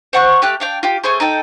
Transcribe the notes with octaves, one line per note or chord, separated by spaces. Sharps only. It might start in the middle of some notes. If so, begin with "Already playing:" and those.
C5 F#5 C#6 F#6
A3 G4 F5 F#6
D4 F5 G5
F4 G4
A3 C#4 G#4 C5
D#4 A4 G5